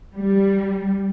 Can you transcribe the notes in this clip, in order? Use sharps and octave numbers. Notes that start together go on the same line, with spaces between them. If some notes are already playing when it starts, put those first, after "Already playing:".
G3